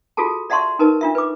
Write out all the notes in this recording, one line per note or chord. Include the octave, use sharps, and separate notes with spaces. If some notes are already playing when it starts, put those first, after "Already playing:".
F4 F#4 G#4 A4 A5
D5 E5 F#5 A5 C6 C#6
D#4 A#4 B4 D#5 A5
D4 F4 E5
B4 D6